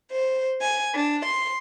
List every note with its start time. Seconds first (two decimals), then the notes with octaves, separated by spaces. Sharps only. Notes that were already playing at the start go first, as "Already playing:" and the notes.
0.11 C5
0.60 G#5
0.95 D4
1.24 C6